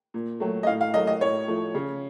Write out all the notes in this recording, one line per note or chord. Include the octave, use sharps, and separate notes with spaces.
A#2
F#3 A3
D#5
A2 F5
F5
F#3 A3 D#5
D#5
A2 C#5
F3 A3
C#3